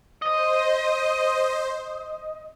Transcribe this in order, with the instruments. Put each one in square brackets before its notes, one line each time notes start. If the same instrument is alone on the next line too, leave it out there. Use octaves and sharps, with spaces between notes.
[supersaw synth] C5 [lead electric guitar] D#5